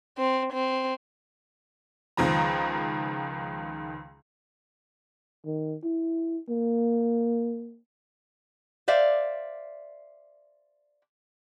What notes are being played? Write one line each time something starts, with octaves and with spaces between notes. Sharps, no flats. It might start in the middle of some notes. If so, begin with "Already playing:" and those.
C4
C4
C#2 D#3 F3 A#5
D#3
E4
A#3
C5 D5 E5 F5